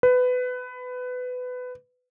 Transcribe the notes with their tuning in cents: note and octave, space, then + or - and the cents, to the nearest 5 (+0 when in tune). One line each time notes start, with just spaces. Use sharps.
B4 +20